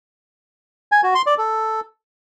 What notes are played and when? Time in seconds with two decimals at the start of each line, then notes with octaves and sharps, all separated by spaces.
0.92 G#5
1.03 F#4
1.15 C6
1.26 D5
1.38 A4